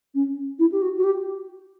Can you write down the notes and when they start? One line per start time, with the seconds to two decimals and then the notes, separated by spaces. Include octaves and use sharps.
0.14 C#4
0.59 E4
0.72 G4
0.82 F#4
0.97 F#4
1.04 G4